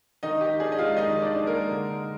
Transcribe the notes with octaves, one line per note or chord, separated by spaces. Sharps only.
D#3 D#4 D#5
D#3 G4
D4 G#4
D#5
G#3 F4 F5
D#3 D#4 D#5
D#3
D4 D5
D4
A#3 A#4
G#3
D3
D#4